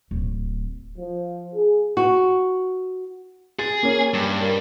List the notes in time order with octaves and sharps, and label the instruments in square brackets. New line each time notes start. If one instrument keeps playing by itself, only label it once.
[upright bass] D1
[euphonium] F3
G#4
[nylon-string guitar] F#4
[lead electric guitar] G#4 [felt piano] A6
[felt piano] A#3 C#4
[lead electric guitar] G2
[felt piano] A#4